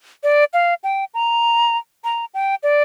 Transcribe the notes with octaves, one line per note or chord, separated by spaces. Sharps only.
D5
F5
G5
A#5
A#5
G5
D5